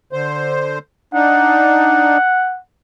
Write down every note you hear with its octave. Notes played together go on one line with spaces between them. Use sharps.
D3 C5
D4 D#4 F#5